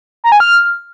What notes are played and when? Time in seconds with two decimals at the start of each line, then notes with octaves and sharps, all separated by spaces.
0.24 A#5
0.32 G#5
0.40 F6